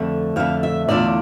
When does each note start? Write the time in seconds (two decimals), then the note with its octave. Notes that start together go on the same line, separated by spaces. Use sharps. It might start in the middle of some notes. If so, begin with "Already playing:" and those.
Already playing: F2 D3 A3
0.36 F2 D3 A3 F5
0.63 E5
0.88 E2 D3 A3 D4 F4 D5